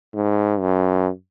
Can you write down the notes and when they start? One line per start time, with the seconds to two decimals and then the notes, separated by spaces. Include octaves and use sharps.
0.14 G#2
0.60 F#2